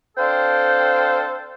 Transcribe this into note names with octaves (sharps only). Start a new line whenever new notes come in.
C4 D4 A4 C5 F5 G5